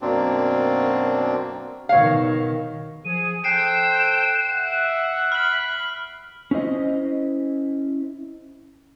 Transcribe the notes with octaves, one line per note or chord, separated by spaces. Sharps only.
F#2 B2 A#3 C4 D4
B2 D#3 C#5 F5
F3 G#4 D#7
A4 C5 G5 F#6 C7 D7 E7
E5 F#5
B5 F6 F#7
C#4 E4 C5 D#5